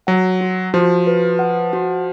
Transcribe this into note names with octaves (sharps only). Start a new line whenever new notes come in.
F#3 F#5
F#4
F3 F#4
B4
F#5
F#4